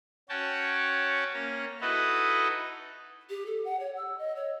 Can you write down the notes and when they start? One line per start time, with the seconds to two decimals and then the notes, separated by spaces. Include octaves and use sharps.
0.29 C#4 F#4 C#5 G5 A5
1.34 A#3 C#4 A#5
1.81 D#4 E4 F#4 A4 B4 D#5
3.30 G4
3.46 A4
3.65 F#5
3.80 C#5
3.97 E6
4.18 D#5
4.36 C#5